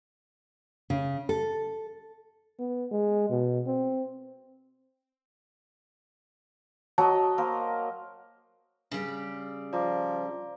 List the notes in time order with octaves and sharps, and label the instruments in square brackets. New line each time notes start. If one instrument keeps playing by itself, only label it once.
[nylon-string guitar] C#3
A4
[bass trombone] B3
G#3
B2
C4
[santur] F#3 D#5 [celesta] A5
[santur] A#3 A#4 C5
[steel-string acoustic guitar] C#3 G3
[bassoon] F3 [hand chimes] D5 A#5 D6